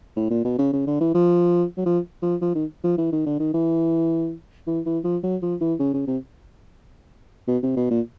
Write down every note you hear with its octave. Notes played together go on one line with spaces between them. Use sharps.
A2
A#2
B2
C#3
C#3
D3
E3
F3
F#3
F3
F3
F3
D#3
F3
E3
D#3
D3
D#3
E3
E3
E3
F3
F#3
F3
E3
C#3
C#3
C3
B2
C3
B2
A#2